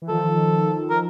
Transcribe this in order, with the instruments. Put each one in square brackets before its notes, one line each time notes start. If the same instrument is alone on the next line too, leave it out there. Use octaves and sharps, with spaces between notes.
[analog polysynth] E3
[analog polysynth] D#3 F3 [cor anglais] A4
[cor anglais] A#4